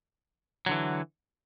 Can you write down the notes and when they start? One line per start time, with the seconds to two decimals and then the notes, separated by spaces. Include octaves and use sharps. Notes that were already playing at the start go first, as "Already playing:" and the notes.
0.66 F#3
0.69 D3
0.71 E3